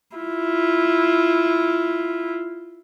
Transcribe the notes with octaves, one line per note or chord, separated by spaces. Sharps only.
E4 F4